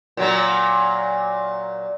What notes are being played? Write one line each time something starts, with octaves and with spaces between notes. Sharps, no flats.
A#2 F#3 A#3